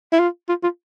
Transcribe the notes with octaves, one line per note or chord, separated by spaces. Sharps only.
E4
F4
F4
F4